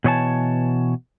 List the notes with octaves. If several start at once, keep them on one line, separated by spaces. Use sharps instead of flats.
B2 E3 C#5 D#5 G#5 A5